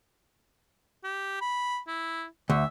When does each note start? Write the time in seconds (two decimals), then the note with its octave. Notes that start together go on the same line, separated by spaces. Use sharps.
1.04 G4
1.41 B5
1.88 E4
2.50 D2 E5